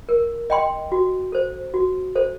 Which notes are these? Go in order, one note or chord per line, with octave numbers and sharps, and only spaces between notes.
A#4
D#5 G5 C6
F#4
A4 C5
F#4
A4 C5